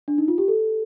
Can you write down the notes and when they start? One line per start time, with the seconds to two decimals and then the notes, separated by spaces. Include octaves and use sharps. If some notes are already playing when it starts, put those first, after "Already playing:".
0.08 D4
0.18 D#4
0.28 F4
0.38 G4
0.48 A4